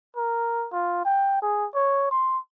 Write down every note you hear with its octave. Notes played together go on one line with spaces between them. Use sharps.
A#4
F4
G5
G#4
C#5
C6